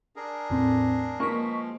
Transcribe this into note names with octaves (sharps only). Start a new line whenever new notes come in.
D4 G#4 A#4
E2 A2 C4
B2 F3 G#3 A#3 C#6 B6